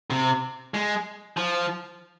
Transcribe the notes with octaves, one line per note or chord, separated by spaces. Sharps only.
C3
G#3
F3